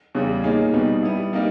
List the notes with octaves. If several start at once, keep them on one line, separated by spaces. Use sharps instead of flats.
E2 C#3 G3
A#2 A#3 D#4 G#4 C#5
B2 G3 B3 D#4
G3 B3 E4
G3 A#3 D#4 A#4